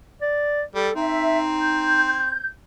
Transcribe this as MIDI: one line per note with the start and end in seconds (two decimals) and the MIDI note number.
0.22 0.63 74
0.75 0.89 55
0.75 0.94 69
0.96 2.40 60
0.96 2.23 63
0.96 1.39 76
1.58 2.45 91